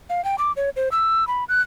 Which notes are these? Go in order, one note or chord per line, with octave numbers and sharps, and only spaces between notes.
F5
G5
D6
C#5
C5
E6
B5
F#6